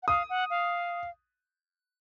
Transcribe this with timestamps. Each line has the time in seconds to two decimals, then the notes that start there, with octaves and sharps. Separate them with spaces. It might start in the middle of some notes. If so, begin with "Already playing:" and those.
0.03 F#5
0.08 F5 D#6
0.30 F#5
0.50 F5